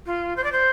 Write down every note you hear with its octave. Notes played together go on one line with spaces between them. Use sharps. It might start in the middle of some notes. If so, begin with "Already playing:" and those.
F4
C5
D5
C5